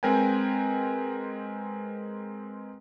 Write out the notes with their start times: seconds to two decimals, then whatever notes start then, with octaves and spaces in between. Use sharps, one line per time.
0.03 G#3 C4 A#4 B4 G5 G#5